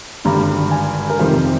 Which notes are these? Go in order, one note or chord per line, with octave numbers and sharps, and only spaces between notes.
G#1 G2 D3 G3 A#5
G#5
A#4
F2 C3 D#3 G3 C5